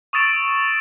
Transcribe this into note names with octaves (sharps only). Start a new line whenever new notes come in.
C#6 D#6 E6 A6 D7 E7